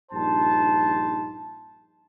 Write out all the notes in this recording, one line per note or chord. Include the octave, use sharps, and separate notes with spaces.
A#1 G2 D#4 C5 A5